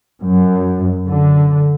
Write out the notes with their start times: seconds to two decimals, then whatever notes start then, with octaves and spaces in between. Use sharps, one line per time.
0.21 F#2
1.08 D3